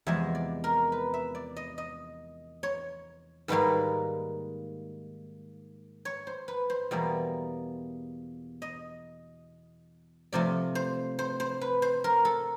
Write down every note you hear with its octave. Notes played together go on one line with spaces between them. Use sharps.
E2 C3 F3 G#3 E5
D5
A#4
B4
E5
D5
D#5
D#5
C#5
G#2 D#3 G3 A#3 B4
C#5
C5
B4
C5
E2 B2 G3 A#3
D#5
C3 F3 A3 D5
C5
C5
C5
B4
C5
A#4
A4